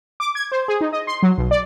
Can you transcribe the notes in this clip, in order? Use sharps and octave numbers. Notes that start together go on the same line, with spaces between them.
D6
G#6
C5
G#4
D#4
D#5
C6
F#3
B1
D5